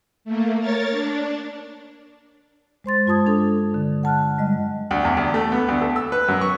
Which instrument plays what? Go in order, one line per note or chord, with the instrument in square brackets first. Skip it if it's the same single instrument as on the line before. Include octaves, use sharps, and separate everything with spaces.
[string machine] A3 A#3
A#4 C#5 A6
D4
[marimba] G#3 C5 C6 A6
G2 F4 A5 D#6 G#6
D4 A4
D3
F#5 A5 F6 F#6
G3 G#3 D#5
[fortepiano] D2
E2
D2
A3
B3
D2
A4
E6
B4
F#2
C#6